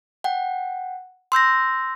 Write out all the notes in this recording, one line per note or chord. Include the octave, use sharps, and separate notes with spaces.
F#5 G5
C6 E6 G6 A#6